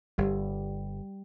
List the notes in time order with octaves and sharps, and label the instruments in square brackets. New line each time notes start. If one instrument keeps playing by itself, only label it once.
[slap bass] G1 [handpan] G3